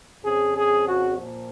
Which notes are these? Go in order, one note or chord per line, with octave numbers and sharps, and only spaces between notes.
F2 C#3 F3 G#4
G#4
F#4
A#2 F3